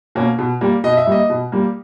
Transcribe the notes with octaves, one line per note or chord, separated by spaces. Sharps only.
B2 A#3 C#4
B2
G3 A#3
B2 D#5
E5
G3 A#3 D#5
B2
G3 A#3